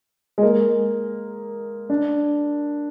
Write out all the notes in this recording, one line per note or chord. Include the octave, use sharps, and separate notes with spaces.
G#3
A#3
D4